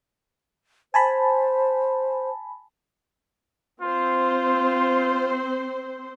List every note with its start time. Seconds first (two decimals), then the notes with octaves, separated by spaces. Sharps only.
0.94 C5 G#5 A5 B5
3.82 C4 F4 C5